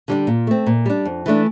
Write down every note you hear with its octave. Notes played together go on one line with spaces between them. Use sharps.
D3 G3 D4
A#2
A3 C4
A#2
G3 D4
F2
E3 A3 D4